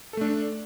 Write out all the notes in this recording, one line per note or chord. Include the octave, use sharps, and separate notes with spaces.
A3 D4 A4